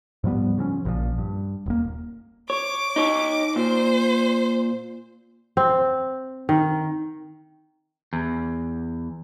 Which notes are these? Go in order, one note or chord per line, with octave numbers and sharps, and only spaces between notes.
G#2 F3 G3 B3
C#3 F3 C4 C#4
A#1 A#2 D3 F3
G2
D#1 A#3
C#5 D6
D#4 C#5
A#2 C5
C4
D#3
E2